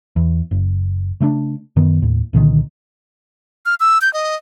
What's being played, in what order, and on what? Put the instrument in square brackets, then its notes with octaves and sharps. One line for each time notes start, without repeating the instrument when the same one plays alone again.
[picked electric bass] E2
F#1
C#3 A3 C4 D4
F#2 D#3 B3
D#2 A2
C2 A#2 D3 D#3
[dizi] F6
E6
G6
D#5